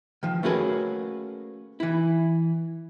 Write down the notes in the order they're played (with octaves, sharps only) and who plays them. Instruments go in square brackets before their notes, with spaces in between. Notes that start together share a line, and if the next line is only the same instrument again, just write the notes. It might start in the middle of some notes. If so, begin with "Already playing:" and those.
[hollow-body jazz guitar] D#3 F3
A3 A#3 C#4 F#4 G#4 B4
E3 E4